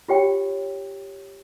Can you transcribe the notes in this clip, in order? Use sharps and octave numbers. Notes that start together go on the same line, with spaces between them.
F4 G4 C#5 G5